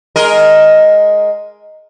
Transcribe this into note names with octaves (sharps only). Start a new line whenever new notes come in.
G#3 A#4 D#5